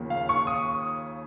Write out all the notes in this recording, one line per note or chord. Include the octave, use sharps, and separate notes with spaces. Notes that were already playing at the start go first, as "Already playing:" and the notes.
Already playing: D#2 C#3 F3 A#3
F5
C#6
D#6